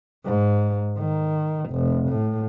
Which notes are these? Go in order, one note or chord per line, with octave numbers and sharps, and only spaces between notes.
G#2
D#3
F1
A2